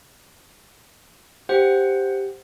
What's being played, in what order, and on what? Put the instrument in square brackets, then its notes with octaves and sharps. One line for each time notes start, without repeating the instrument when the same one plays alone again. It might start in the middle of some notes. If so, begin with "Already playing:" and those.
[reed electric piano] G4 [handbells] C5 F#5